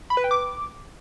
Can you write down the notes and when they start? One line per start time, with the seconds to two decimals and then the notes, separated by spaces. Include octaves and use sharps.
0.10 B5
0.17 B4
0.24 G5
0.31 D6